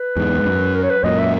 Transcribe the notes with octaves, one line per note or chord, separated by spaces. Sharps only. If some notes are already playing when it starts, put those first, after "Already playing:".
Already playing: B4
E2 G#2
G#2
F#2
A#4
C#5
B4
F#2 A#2 D#5
E5